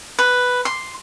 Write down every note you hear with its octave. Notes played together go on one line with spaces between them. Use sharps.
B4
C6